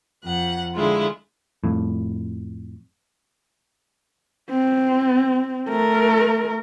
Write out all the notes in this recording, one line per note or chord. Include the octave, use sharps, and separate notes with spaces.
F2 F#5
D3 G#3 E4 F4
F2 A2
C4
A3 A#4